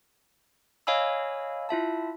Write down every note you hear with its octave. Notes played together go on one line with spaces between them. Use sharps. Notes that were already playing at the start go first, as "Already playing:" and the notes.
C#5 D#5 F5 G#5 B5 E6
E4 F4 E5 A5